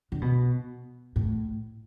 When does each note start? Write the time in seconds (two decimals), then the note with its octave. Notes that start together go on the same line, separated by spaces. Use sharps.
0.12 D3
0.22 B2
1.16 A2